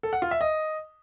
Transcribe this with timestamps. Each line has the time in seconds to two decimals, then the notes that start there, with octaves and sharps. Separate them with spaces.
0.03 A4
0.13 F#5
0.22 F4
0.31 E5
0.41 D#5